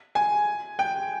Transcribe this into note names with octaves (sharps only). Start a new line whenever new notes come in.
G#5
G5